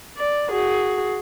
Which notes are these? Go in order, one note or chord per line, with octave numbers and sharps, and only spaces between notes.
D5
F#4 G#4